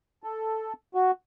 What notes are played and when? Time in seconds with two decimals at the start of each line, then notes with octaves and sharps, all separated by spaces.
0.24 A4
0.95 F#4